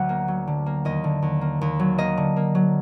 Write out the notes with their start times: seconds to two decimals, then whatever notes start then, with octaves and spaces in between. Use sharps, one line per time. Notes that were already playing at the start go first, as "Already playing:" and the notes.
Already playing: D2 D3 F#3 F#5
0.09 A#3
0.28 F#3
0.47 D3
0.66 A#3
0.85 D#2 D#5
1.04 D3
1.22 D#2
1.41 A#3
1.61 D#2
1.79 F#3
1.98 A#3 D#5
2.17 D3
2.36 A#3
2.55 F#3